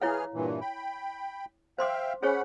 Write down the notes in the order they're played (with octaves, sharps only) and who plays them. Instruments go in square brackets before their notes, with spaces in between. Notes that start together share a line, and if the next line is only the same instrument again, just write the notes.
[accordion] E3 G#4 F6 [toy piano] E4 C#5 F5
[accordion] G2 A#2 E3
G5 B5
[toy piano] C5 C6 D6 [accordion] E5 F5 G5
[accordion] C#4 F#5 B5 [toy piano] G#4 C5 C#5